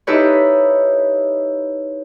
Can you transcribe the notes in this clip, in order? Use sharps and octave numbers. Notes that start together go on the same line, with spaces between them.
D#4 E4 G4 A4 B4 C#5